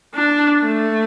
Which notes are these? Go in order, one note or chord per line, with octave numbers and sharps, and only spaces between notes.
D4
A3